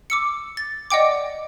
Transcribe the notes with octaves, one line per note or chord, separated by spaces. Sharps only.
D6 E6 C#7
A6
D5 D#5 F#5 G5 D6